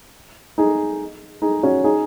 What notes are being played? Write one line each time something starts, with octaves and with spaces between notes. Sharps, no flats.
D#4 G#4
D#4 G#4
C#4 F#4
D#4 G#4